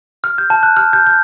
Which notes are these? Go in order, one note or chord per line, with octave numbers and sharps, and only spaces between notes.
F6
G6
A5
F#6
F6
G6
G6